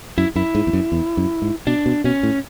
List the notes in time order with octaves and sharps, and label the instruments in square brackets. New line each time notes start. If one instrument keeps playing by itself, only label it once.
[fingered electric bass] F#2 [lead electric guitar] E4
[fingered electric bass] F#2 [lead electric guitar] E4
[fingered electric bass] G#2
E2
F#2
E2
F#2
G#2
[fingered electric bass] B2 [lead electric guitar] D4
[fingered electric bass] B2
[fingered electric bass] B2 [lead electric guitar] C#4
[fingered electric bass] A2